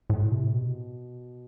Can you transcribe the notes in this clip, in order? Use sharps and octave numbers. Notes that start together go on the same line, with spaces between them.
A2
C3
B2